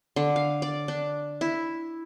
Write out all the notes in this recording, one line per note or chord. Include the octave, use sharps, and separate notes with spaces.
D3
F5
D5
D4
E4